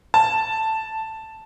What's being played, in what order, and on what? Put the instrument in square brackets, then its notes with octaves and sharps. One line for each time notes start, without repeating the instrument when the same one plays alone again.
[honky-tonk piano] A5